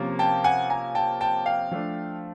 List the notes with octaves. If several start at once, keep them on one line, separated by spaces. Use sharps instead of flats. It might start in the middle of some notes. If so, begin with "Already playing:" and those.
Already playing: C3 F3 A#3 C#4
G5 A5
F#5 G#5
G#5 A#5
G5 A5
G5 A5
F5 G5
F3 A3 D4